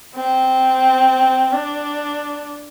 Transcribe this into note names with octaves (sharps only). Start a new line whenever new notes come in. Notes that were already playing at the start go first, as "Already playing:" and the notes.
C4
D4